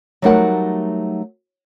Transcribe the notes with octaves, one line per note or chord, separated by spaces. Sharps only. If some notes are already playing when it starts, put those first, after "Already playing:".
F#3 G3 A3 D#4 A#4 F#5